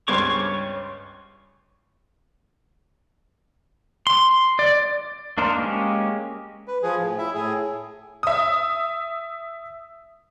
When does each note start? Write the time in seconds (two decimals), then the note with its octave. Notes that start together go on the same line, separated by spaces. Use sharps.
0.08 C#2 G2 C5 C#5 C#6 D6
4.07 C6
4.59 D5
5.38 A#3 D4 D#4 A#4 C5
5.58 G#3 A#3 C#4 G4
6.68 B4
6.83 F3 G#4
7.02 A2
7.18 E4 E5
7.34 A2 G#4
8.23 E5 D#6